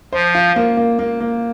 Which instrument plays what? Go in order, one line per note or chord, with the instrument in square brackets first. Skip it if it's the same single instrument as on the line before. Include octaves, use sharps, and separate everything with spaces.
[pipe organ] F3 [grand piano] C5
[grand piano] F4
A#3
A#3
A#3
A#3